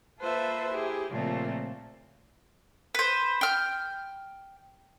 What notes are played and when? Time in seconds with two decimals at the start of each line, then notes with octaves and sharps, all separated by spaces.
0.19 A#3 F4 A4 B4 C5 E5
0.71 E4 G4 G#4
1.11 A#2 C#3 F3 A3 A#3 C4
2.95 B4 C5
3.41 G5 F6